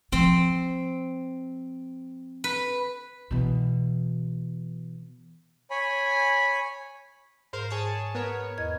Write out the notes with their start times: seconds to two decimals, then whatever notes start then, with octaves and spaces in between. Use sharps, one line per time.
0.12 F3 C4
2.44 B4
3.31 B2 E3
5.70 C#5 G#5 B5
7.53 G#2 A#4 C5 F5
7.70 G#4 C#5 A5
8.15 B3 A#4 C#5
8.58 E2 D#5 G#6